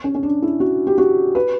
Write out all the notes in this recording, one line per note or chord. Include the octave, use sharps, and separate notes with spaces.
C#4
C#4
D4
E4
F#4
G4
F#4
B4